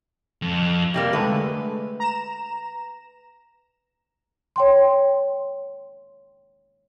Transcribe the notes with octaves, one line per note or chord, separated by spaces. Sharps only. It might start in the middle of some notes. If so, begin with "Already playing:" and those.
F2
C3 G3 A#3
D3 G#3 A3 B4
A#5 E7
C#5 G5 C6